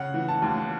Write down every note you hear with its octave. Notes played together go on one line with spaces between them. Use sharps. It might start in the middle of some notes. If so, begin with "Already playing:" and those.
Already playing: C#3 F#5
E3
A5
D#2